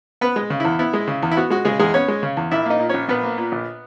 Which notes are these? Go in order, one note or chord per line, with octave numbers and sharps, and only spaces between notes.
B3 B4
G#3
C#3
E2 E4
B3 E4
G#3
C#3
E2
E4
B3 F#4
G#3 F#4
C#3 G#3 G#4
E2 G#3 G#4
B3 C#4 C#5
G#3
C#3
E2
A#1 E4 E5
A#3 D#4 D#5
A#2
A#1 C#4 C#5
A#1 B3 B4
A#3
A#2
A#1